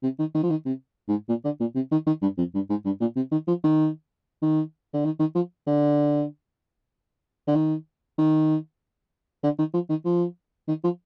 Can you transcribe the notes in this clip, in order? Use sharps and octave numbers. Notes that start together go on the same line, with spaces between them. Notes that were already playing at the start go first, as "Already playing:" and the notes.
C3
D#3
D#3
F3
D#3
C3
G#2
A#2
D3
A#2
C3
D#3
D#3
G2
F2
G2
G#2
G2
A#2
C3
D#3
F3
D#3
D#3
D3
D#3
D#3
F3
D3
D3
D#3
D#3
D3
D#3
F3
D#3
F3
D#3
F3